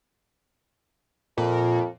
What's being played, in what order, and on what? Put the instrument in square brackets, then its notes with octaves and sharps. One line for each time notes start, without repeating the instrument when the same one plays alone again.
[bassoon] F2 [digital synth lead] A#2